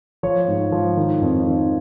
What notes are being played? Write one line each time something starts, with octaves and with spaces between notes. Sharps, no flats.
F3 C#5
G#2
F3
D#3
F2
D#3